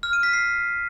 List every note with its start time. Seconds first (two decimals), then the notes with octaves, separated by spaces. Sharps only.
0.03 F6
0.13 D#7
0.23 B6
0.33 C7